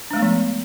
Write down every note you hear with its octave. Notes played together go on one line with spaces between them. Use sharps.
F3 G#3 A3 B3 D4